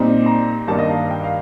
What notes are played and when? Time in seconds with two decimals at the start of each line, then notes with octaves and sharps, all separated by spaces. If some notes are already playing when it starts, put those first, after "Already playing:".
Already playing: A#2 G3 C4 D#4
0.26 A#5
0.67 G2 D#3 A#3 D4 A5
0.79 D#5
0.89 F5
1.11 G5
1.23 F5